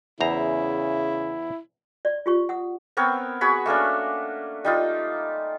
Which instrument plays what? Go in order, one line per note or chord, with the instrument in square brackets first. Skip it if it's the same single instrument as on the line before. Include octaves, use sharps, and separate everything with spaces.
[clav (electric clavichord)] E2 C5 A#5 [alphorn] C#3 [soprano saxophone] E4
[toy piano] D5
F4 G4 C#6
F#5 D#6
[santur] B3 C4 A#4 C#5
F#4 G#4 C#5 B5
A3 A#3 C#4 D4
G3 D#4 F4